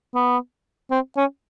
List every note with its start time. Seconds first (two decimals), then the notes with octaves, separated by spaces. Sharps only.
0.14 B3
0.91 C4
1.17 C#4